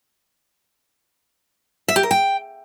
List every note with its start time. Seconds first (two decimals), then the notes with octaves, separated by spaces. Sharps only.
1.88 E5
1.96 G4
2.03 A#4
2.11 G5